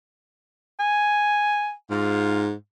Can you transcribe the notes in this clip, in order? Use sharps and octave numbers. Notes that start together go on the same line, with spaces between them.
G#5
G#2 F4